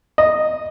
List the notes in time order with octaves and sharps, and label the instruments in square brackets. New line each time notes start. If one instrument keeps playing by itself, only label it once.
[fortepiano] D#5